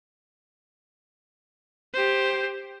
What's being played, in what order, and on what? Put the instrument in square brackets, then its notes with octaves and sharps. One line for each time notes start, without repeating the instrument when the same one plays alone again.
[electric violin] G4 C5